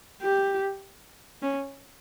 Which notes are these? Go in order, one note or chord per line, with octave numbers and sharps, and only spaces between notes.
G4
C#4